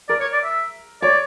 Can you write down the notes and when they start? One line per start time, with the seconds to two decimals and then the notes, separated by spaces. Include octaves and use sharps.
0.09 A#4 D5
0.20 C#5
0.33 D5
0.44 E5
1.02 C#5 D5